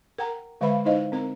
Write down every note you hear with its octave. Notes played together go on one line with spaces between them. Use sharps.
A#4 F#5 G5 A#5
D3 G#3 B4 E5 F5 B5
D#4 E4 C5 D#5 F5
C4 A#4 A#5